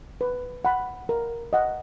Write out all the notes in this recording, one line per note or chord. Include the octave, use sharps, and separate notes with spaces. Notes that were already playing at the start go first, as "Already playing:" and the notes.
B4
F#5 B5
A#4
D#5 F#5